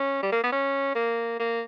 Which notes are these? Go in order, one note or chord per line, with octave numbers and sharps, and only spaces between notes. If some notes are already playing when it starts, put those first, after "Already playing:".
Already playing: C#4
G3
A#3
B3
C#4
A#3
A#3